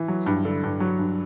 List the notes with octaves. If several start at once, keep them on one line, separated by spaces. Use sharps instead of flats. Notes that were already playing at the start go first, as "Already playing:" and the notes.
Already playing: E3
F#3
G2
D3
G2
F#3
G2